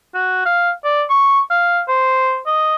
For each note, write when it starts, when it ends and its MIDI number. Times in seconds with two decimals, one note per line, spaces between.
0.14 0.45 66
0.45 0.71 77
0.84 1.03 74
1.10 1.40 85
1.50 1.81 77
1.88 2.38 72
2.46 2.76 75